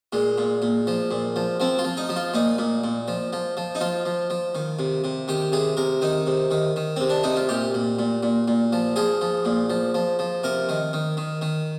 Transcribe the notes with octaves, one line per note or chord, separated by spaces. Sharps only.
A#2 G#3
A#2
A#2
F3
A#2
F3
F3 C4
F4
F3
D#4
F3
F4
A#2 D#4
A#2
A#2
F3
F3
F3
D#4
F3 F4
F3
F3
D#3
C3
C3
D#3 G4
C3 G#4
C3 A#4
D#3 D#4
C3
D#3
D#3
C3 C4
D4
C3 D#4
F4
A#2 G4
A#2
A#2
A#2
A#2
F3
F3 G#4
F3
A#2
F3
F3
F3
C3 A#4
D#3
D#3
D#3
D#3